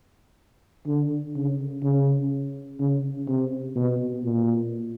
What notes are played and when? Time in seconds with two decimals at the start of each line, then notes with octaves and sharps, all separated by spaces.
0.87 D3
1.35 C#3
1.83 C#3
2.80 C#3
3.28 C3
3.75 B2
4.24 A#2